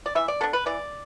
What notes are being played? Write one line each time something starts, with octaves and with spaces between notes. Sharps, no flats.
D5
E3 E5
D5
B3 D4 A4
B4
E3 D5